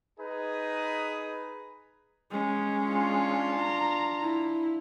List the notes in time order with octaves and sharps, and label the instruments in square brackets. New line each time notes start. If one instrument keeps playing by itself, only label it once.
[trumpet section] D#4 G#4 B4
[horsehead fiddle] G#3 C#4
[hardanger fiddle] D4 F4
[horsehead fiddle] A#5
E4